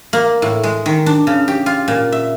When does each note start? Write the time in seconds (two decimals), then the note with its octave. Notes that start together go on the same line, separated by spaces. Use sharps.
0.13 A#3
0.42 A2
0.63 G#3
0.86 D#3
1.06 D4
1.27 C#3
1.48 G4
1.66 F4
1.88 A#2
2.12 E5